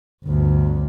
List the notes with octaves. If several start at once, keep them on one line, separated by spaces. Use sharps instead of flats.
G1 D2